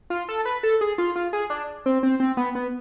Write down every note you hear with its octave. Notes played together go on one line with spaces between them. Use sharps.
F4
A4
B4
A4
G#4
F4
F4
G#4
D4
C4
C4
C4
B3
B3